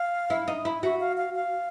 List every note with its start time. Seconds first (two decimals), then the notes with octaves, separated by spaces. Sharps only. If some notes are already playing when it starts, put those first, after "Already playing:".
Already playing: F5
0.30 E4
0.48 D#4
0.65 E4
0.83 F#4 E5
1.00 F5
1.17 F5
1.35 F5